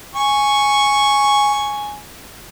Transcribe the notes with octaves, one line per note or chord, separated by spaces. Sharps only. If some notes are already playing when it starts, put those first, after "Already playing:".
G#5 C#6